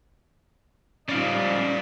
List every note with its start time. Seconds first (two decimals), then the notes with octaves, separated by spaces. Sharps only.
1.09 C#3 F3 G3 D#4 D5 F5